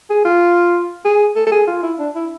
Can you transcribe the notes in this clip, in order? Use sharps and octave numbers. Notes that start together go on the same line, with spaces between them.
G#4
F4
G#4
A4
A4
G#4
F4
E4
D4
E4